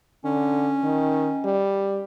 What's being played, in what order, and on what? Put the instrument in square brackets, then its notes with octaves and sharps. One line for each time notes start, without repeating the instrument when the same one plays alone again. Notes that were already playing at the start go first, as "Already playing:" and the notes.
[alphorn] D3 [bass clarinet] C#4
[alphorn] D#3
G3